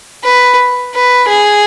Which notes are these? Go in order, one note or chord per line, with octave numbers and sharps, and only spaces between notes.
B4
B4
G#4